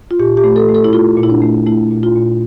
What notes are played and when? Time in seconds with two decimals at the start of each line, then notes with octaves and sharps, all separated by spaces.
0.11 F4
0.19 A#2 G4
0.37 G4
0.44 A3
0.56 A4
0.69 A3
0.75 A4
0.84 E4
0.93 A3 F4
1.17 A#2
1.23 E4
1.30 D4
1.42 A3
1.67 A3 E4
1.91 A#2
2.03 F4
2.15 A#2